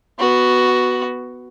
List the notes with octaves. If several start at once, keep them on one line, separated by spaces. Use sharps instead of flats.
B3 F#4